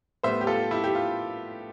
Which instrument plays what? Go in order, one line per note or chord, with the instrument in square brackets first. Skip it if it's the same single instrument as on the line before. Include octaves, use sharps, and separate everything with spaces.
[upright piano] A2 G3 B3 C5 E5
G4
F4 A4
E4 G4
G4
F4